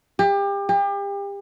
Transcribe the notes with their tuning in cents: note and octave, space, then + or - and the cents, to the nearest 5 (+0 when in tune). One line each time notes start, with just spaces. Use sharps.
G4 +30
G4 +35